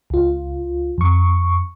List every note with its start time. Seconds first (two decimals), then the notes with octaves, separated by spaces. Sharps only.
0.10 C#2 F4
0.98 F2 C#6